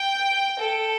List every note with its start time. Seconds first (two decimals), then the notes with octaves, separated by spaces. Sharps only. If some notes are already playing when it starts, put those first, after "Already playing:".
Already playing: G5
0.59 A4